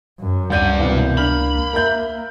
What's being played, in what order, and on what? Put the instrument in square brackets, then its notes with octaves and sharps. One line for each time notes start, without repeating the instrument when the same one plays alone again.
[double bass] F#2
[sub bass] C#2 [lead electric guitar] G2 D5 [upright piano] F#5 G6 D#7
[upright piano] C2 B2 E3 [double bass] A#3
[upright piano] D4 F6 F#7 [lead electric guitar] B5
[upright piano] A#4 E5 G6